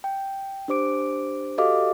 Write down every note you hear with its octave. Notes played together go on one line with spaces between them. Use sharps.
G5
D4 G4 C5 D6 D7
F#4 G4 A4 D#5 F5 D6